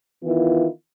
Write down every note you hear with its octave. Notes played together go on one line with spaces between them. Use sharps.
D#3 E3 B3 E4 F4